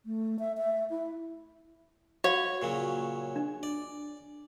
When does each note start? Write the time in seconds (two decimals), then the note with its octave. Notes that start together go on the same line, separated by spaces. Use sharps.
0.06 A3
0.39 E5
0.58 E5
0.90 E4
2.24 F#4 C#5 F5 F#5
2.62 A#2 C#3 F#3
3.36 D4
3.63 D5